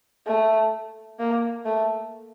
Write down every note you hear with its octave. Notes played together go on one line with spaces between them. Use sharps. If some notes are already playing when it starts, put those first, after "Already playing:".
A3
A#3
A3